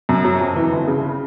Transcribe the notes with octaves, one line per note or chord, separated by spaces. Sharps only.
F#2
F#3
F2
E3
G1
C#3